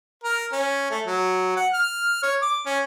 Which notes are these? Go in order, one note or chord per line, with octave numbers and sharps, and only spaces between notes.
A#4
C#4
A3
F#3
F#5
F6
C#5
D6
C#4